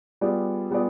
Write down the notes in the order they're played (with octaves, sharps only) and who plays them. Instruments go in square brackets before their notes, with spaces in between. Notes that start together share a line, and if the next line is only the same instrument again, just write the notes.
[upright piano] G3 B3 F4 G#4 D5
G3 B3 F4 G#4 D5